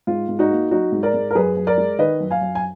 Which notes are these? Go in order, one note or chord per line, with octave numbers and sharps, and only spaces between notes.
G#2 F4
G#2
D#4 F#4
A#3
F#3 D#4 F#4
G#2
A#4 D5
G#2
A#4
F#2 G#4 B4
F#2
A#4 D5
G#3
D#3 B4 D#5
F#2
F5 G#5
F#2
G#5